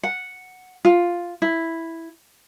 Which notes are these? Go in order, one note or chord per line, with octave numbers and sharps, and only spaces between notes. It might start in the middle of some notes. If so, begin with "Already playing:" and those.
F#5
F4
E4